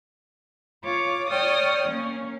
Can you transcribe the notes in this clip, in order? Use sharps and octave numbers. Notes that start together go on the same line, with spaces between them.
F4 C#5 D6
C#5 D5 G5 D#6 F6
A#3 C#4